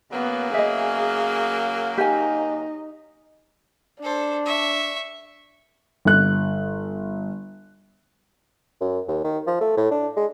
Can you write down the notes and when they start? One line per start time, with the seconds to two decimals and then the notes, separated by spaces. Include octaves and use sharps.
0.12 C#3 F#3 A#3 B3
0.54 G#4 D#5 E5
1.98 D#4 G4 G#5
4.03 D4 A4 C5
4.46 E5 C#6
6.05 G1 F#6
8.81 F#2
9.08 D#2
9.24 D#3
9.47 F3
9.61 A3
9.77 A2
9.91 D4
10.16 G#3